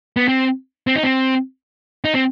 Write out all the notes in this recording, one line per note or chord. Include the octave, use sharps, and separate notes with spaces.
B3
C4
C4
D#4
C4
D#4
C4